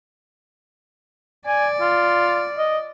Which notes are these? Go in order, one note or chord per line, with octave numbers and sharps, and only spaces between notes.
D5 G#5
F4
D#5